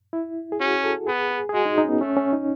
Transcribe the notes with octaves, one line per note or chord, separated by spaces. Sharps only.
E4
G#4
C#4 F#4
A4
B3 G#4
G#4
G#4
G#3 F#4
D#4
D#4
C#4
B3
A3 C#4
C#4
D#4